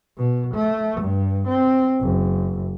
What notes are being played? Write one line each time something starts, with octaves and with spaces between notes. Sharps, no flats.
B2
A3
G2
C4
F#1